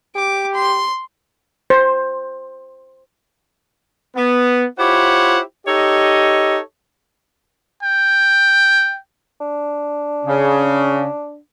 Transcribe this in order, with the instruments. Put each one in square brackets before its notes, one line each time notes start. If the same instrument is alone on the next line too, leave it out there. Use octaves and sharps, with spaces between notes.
[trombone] G4 [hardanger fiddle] D6
[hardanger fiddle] C6
[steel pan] C5
[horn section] B3
E4 F4 G4 C5 C#5 F#5
D#4 G4 A4 C#5 D#5
[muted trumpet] G5
[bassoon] D4
[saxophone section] C#3